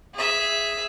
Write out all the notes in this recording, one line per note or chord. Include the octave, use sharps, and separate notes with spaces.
G#4 E5